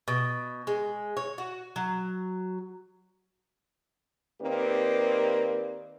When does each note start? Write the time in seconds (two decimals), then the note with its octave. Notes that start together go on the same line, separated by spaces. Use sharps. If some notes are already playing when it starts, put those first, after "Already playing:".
0.08 B2
0.67 G#3
1.17 C#5
1.38 F#4
1.76 F#3
4.42 D#3 A#3 C4 G4 B4 D5